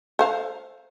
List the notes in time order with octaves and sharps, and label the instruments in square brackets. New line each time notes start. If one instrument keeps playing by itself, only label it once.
[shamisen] A4 C5 F5